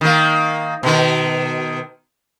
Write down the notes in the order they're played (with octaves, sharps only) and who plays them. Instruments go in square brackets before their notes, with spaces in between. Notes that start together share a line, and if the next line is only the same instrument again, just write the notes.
[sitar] D#3 A#3
B2 D#3